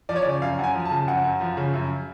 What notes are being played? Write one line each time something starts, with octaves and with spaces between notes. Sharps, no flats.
F3 D5
C#5
C#3 D5
F#2 F5
F#2 F#5 G#5
F3
A5
C#3
F#2 F#5
F#2
F3
C#3
F#2